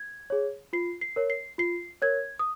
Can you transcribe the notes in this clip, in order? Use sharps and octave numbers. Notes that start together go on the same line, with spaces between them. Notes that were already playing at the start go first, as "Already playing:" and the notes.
Already playing: G#6
G#4 C#5
F4 C7
C7
A#4 C#5
C7
F4 C7
A#4 C#5 G#6
D#6